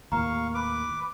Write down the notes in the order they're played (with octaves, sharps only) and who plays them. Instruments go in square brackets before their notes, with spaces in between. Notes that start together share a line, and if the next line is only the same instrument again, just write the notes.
[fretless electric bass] D#2 A2 A#3 [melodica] F5 C#6 [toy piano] A#5
[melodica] B4 D6